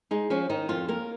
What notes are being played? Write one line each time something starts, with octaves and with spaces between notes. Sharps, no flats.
G#3 D#4
F3 C#4
D#3 D#4
F2 F4
A#3 A#4